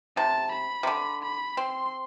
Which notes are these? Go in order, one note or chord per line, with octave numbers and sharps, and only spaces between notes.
C3 A5
B5
C3
D3
B5
C4 C6